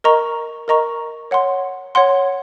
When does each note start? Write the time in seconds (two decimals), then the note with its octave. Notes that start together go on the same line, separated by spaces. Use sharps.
0.04 A#4 D#5 A#5 C#6
0.68 A#4 D#5 A#5 C#6
1.31 C#5 F#5 C6
1.95 C#5 F#5 C6